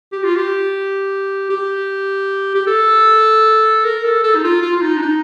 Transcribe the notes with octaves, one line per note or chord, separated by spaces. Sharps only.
G4
F4
G4
G4
G4
A4
A#4
A4
A4
D#4
F4
F4
F4
D#4
D4
D#4